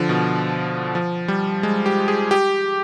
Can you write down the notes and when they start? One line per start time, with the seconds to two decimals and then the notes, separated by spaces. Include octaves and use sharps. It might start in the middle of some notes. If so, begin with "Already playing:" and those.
Already playing: D3 F3
0.09 B2
0.95 F3
1.28 G3
1.63 G#3
1.86 G4
2.08 G#4
2.31 G4